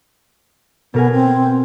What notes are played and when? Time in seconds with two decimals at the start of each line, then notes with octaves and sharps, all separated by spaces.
0.94 B2 B3 A#4 G#5
1.13 C4